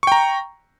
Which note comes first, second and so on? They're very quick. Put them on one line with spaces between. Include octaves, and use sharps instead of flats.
C#6 G5 A#5